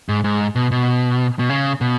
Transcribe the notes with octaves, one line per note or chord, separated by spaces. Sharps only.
G#2
G#2
B2
B2
B2
C#3
B2